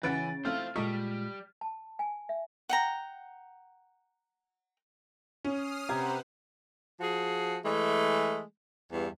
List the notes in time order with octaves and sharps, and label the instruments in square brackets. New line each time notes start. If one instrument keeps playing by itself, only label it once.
[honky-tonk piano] C#3 A6 D7 [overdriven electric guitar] E3 [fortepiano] B4 F#5
[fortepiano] A3 C4 E4 [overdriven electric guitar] C5 F5 [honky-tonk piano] F6
[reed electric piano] A#2 G#3 F4 [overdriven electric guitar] G3 [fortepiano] A4 D#5 C#6 [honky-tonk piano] B6
[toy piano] A5
G#5
E5
[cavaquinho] F#5 G5 A#5
[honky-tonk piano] C#4 [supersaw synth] D#6 F6 C7
[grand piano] C3 G4 G#6 [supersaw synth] B4 C5 F#5 [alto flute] A#5
[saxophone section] F3 F#4 G#4
E3 G#3 A3
E2 G2